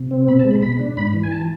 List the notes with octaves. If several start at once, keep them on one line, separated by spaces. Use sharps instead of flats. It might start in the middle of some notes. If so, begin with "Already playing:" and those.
Already playing: C3
C4
B2 B5
A5
G#3
B5
B2 B5
D4
G#2 B5
E3
G#5
A5